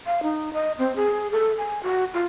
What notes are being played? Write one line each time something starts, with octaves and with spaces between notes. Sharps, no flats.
F5
D#4
D#5
C4
G#4
A4
G#5
F#4
F4